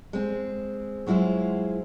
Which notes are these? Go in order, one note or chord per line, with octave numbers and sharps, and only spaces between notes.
G#3 C4
F#3 G#3 E4 F4 C5